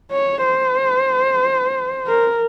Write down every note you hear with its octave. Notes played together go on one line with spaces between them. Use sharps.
C#5
C5
A#4